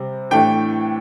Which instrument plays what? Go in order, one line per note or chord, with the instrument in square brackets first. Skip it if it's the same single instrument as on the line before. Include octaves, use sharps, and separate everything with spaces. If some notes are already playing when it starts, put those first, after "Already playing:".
Already playing: [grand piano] C3 G3 C4
A2 E3 A3 D4 G5